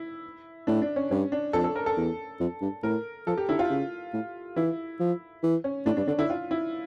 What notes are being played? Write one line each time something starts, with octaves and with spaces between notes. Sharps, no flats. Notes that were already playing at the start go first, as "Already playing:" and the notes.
Already playing: E4
A2 D4
D4
C#4
G2 C#4
D4
F2 A4
A4
A#4
A4
E2
F2
G2
A2 A#4
F3 A4
G4
D3 E4
F4
C#3
A2
E3 E4
F3
E3
C#4
A2 D4
G2 D4
D3 D4
D3 E4
F4
E4